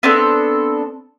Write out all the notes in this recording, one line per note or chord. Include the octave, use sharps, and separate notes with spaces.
B3 C4 D4 A4